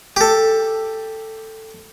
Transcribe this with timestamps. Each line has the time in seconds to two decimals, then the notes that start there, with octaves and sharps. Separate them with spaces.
0.16 G4 A4